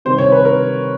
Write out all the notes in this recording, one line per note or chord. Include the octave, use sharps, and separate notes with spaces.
C3 D#3 G3 C5
C#5
B4
A#4